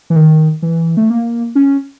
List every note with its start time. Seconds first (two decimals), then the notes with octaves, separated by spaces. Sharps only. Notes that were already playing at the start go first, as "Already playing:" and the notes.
0.10 E3
0.16 D#3
0.62 E3
0.97 A3
1.10 A#3
1.55 C#4